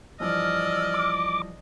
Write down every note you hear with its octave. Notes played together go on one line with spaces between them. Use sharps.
G2 E3 F3 D5 D#5 E6 F6
D6